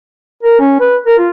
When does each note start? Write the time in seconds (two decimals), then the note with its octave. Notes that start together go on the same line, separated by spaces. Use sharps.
0.43 A#4
0.60 C#4
0.81 B4
1.07 A#4
1.19 F4